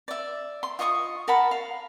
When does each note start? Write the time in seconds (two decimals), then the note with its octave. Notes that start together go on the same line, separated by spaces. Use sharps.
0.08 D5 E5
0.63 C6
0.79 F4 D#5 C#6 D#6
1.28 A#4 F#5 A5 B5
1.51 F5